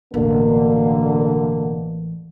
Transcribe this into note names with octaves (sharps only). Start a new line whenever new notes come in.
A1 E2 B2 D3 A#3